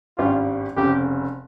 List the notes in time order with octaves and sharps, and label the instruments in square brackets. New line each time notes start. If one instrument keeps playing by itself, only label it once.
[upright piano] G#1 G2 G3 C#4 G4 [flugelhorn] F4
[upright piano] F1 F2 C#3 [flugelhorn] G4